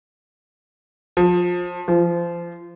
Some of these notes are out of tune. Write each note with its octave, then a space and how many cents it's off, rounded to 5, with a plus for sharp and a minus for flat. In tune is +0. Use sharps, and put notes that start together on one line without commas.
F3 +20
F3 -30